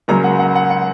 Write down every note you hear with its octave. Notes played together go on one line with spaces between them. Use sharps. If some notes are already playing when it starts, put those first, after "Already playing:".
C#2 C#3 F#3 A#3 A#5
F#5
F#5
F#5
F#5